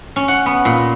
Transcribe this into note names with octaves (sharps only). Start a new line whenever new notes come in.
C#4
F#5
B3
A#2